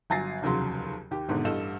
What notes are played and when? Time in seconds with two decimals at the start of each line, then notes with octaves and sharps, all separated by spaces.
0.10 G1 F#3 G#5 A6 A#6 C7
0.42 F1 D#2 C#3 F3 F#3 C6
1.11 D#2 G4
1.29 G#1 G#2 B2 D3
1.44 A1 G2 A4 D#5 E7